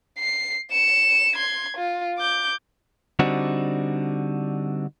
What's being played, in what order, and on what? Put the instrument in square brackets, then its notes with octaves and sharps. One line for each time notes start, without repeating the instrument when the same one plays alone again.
[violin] C7
C#7 E7
C6 G#6
F4
D6 G6
[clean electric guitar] D3 G3 C4 D4 D#4 F#4